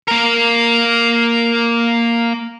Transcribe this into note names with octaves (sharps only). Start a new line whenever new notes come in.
A#3 A#4